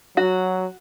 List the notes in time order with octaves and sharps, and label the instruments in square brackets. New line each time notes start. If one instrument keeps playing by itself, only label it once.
[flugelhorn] F#3 [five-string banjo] F#4